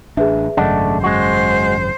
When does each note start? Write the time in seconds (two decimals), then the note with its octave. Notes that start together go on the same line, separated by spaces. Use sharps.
0.17 A1 D4 G#4 B4 E5
0.57 G#1 F#2 C#3 A3 D4 D#5 F#5
1.04 G#3 F#4 C5